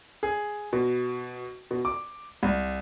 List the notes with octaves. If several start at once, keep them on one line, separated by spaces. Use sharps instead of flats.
G#4
B2
B2
D6
C2